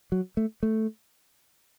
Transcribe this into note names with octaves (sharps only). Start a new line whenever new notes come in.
F#3
A3
A3